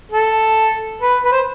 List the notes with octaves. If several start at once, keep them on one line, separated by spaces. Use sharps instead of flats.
A4
B4
B4
C5